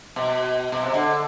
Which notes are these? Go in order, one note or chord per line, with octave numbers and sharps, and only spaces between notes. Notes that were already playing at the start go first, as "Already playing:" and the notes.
B2
B2
C3
D3